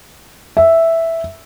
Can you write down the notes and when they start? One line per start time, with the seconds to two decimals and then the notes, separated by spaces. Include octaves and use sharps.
0.57 E5